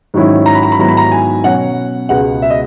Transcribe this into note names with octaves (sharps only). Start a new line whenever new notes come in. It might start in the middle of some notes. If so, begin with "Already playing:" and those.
G#2 D#3 F#3 C#4 E4
A#5
B5
A#5
B5
G#2 D#3 F#3 B3 E4 A#5
B5
A#5
G#5
B2 F#3 C#4 F#5
C#2 B2 G#3 B3 F#5
E5
D#5